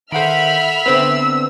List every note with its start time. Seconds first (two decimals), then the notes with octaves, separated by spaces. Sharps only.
0.12 D#3 A4 C5 E5 F#5 B5 F6 D7
0.86 D3 B3 C4 B4 E6 B6